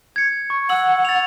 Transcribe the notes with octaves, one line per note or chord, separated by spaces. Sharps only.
G#6 C#7
C#6
F#5 E6 F#7
A6 F7